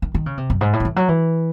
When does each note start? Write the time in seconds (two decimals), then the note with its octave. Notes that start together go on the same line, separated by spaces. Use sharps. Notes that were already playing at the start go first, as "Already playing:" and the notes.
0.02 D#3
0.15 D#3
0.26 C#3
0.37 C3
0.50 F#2
0.61 G#2
0.73 A2
0.80 D#3
0.85 E3
0.96 F#3
1.08 E3